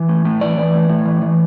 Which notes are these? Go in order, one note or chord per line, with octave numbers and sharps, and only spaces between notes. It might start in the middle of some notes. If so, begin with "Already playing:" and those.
Already playing: E3
A2
A2
E3 D5
E3
A2
A2
E3
E3